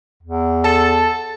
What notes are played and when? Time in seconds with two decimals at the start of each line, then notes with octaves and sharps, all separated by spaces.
0.23 E2
0.64 A4 A5